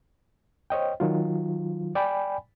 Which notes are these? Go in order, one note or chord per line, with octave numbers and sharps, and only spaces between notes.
C5 C#5 D#5 G5
D#3 F#3 F4
D5 G5 G#5 B5